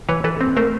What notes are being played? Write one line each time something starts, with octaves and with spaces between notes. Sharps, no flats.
E3 B4 C#5
E3 A4 B4
C4
A3 A#4 C5